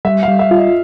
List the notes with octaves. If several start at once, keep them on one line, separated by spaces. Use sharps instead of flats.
G3 E5
F5
G3
E5
F4
D#5